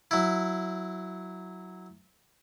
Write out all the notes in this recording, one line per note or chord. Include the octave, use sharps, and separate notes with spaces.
F#3 E4